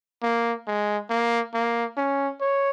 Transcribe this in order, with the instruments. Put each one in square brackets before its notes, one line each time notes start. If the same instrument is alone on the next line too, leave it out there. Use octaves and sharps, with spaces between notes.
[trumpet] A#3
G#3
A#3
A#3
C#4
C#5